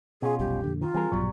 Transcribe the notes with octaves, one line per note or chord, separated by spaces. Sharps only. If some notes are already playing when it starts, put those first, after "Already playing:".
B2 C#4 F4 G#4
F1 B1 G3 G4
F2 A#2 D3
D#3 F4
E3 G3 C4 G#4 A#4
A#1 G2 B2 F#3 G3